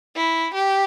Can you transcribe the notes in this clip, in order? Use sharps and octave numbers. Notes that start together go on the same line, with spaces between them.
E4
G4